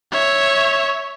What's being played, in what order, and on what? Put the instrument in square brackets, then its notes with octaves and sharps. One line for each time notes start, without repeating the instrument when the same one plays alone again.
[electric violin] C#5 E5